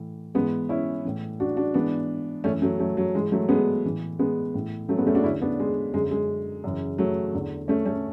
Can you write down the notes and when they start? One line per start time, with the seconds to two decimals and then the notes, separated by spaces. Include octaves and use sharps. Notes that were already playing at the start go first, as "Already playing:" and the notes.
Already playing: A2 E3
0.35 G#2 E3 G#3 B3
0.69 C#4 E4
1.05 A2 E3
1.40 D4 F#4
1.56 D4 F#4
1.74 G#2 E3 B3 D4
2.44 F#2 A3 C#4
2.47 E3
2.62 F#3 A3
2.79 F#3 A3
2.97 F#3
3.15 G#2 E3 G#3
3.32 F#3 A3
3.49 G#3 B3
3.84 A2 E3
4.19 G#3 B3
4.54 A2 E3
4.89 F#3 A3
4.97 G#3 B3
5.07 A3 C#4
5.15 D4 F#4
5.24 E2 D3 C#4 E4
5.41 B3 D4
5.60 G#3
5.94 F#2 D3 G#3
6.11 G#3
6.64 F#2 C#3 E3
6.98 F#3 A3
7.33 E2 D3
7.68 A3 C#4
7.85 A3 C#4